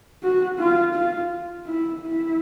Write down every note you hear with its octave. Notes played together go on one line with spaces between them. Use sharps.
F#4
F4
F4
E4
E4